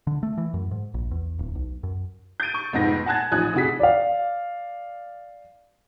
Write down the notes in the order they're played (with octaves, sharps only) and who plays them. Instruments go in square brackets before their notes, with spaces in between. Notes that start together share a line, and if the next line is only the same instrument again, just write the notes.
[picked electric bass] D3
A3
E3
F#2
G#2
A#1
E2
D1
B1
F#2
[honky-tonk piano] G6 A6 D7 D#7
C#6
F1 F2 G#2 B3 A#6
F#5 G#5 A5 F#6 G#6 A6
A1 F3 D#4 G#5 D#6 F#6
F1 A2 C3 F#4 G#4 B6
[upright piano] D5 F5